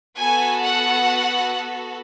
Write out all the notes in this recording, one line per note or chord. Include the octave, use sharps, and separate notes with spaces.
B3 F#4 A4 G#5
F#5